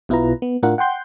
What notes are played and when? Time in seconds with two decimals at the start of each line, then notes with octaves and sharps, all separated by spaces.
0.09 B1 B2 E4 F4 B4 A#5
0.42 B3
0.63 A2 D4 F4 A#4 F#5
0.78 F#5 G5 C6 G6